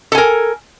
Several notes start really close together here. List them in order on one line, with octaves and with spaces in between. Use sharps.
A4 G#5 A#4